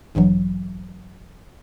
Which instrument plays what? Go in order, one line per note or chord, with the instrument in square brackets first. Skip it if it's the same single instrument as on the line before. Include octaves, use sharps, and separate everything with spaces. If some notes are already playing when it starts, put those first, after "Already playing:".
[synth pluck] A1 G2 E3 F#3